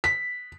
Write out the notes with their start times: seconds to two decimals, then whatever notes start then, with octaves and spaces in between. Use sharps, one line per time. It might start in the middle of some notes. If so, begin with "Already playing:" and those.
0.04 B6